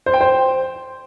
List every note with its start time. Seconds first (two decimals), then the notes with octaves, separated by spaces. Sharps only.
0.06 C5
0.14 G5
0.21 C5